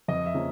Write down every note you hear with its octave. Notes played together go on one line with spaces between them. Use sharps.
F2 D#5
E5
C#3 F3 A#3 C#4